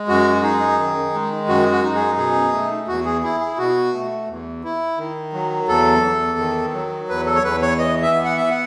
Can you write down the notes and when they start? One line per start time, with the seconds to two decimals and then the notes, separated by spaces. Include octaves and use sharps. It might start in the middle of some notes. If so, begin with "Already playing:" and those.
Already playing: G#3
0.08 F#2 F#4
0.43 D#4 G#4
0.79 D#3
1.14 G#3
1.48 F#2 F#4
1.72 F#4
1.84 D#4
1.95 G#4
2.18 B2 G#4
2.53 A3
2.88 E2 F#4
3.05 G#4
3.23 E4 G#4
3.40 G#4
3.58 B2 F#4
3.94 A3
4.28 E2
4.64 E4
4.98 D#3
5.33 F#3
5.68 E2 A4
6.03 E2
6.39 D#3
6.74 F#3
7.09 E2 B4
7.26 A4
7.35 C#5
7.43 E2 B4
7.62 C#5
7.78 E3 D#5
8.02 E5
8.14 B3
8.25 F#5
8.37 E5
8.50 F#5